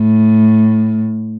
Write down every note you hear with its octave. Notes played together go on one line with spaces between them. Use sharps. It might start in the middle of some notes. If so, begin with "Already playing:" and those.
Already playing: A2